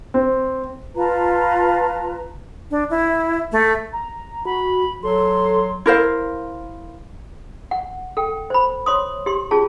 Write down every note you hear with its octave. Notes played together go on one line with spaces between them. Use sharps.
C4
F4 B4 A5 A#5
D4
E4
A3
A#5
F#4 B5
F#3 A4 C6
E4 A#4 C5 F5
F#5
A4 G5
C5 B5
C#5 C6 D#6
G4 C6
C#4 F4 G#4 A5